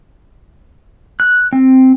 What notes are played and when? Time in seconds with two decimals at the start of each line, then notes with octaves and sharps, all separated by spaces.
1.20 F#6
1.53 C4